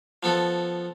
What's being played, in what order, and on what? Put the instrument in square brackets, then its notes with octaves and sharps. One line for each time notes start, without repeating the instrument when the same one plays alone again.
[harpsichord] F3 B3 A4